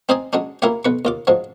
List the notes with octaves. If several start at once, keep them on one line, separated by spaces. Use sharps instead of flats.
C4 D#4 C5 D5 D#5 G#5
F#3 G#3 C#4 D4
A#3 E4 F4 G4 C#5
B1 B4 C#6
D#2 F4 D6
G#2 F3 F#3